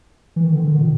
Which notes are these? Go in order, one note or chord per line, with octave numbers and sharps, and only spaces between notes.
E3
D#3
D3
D3
D#3
A#2